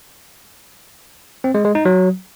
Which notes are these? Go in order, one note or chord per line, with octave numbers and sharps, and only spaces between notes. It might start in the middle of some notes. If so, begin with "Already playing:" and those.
C4
G#3
G#3
D#4
F#3